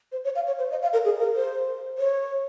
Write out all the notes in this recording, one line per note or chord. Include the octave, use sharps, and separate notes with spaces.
C5
C#5
F5
C#5
C5
D#5
F5
A#4
G#4
A#4
C5
C#5